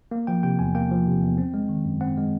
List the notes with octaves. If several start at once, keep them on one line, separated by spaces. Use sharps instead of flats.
A#3
F3 G5
C3 G5
E2 G#5
A#3 G5
F3
C3
E2
C4
G#3
D#3
F#2
C4 F#5
G#3